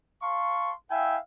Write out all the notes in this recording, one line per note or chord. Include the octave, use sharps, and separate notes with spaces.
F5 A5 C6 C#6
E4 E5 F5 G5 G#5